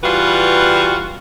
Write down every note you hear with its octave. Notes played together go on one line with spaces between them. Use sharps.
E3 G3 F4 F#4 B4